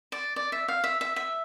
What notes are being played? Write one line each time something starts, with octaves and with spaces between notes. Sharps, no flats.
D5
D5
E5
F5
E5
E5
E5